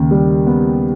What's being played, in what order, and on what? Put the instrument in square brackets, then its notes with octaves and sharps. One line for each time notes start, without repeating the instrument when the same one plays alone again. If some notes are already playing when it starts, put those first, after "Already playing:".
Already playing: [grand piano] D#2 C#3
G3
B3